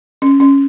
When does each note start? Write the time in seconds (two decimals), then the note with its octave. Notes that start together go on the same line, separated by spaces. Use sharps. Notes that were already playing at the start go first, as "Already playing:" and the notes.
0.22 C#4
0.40 C#4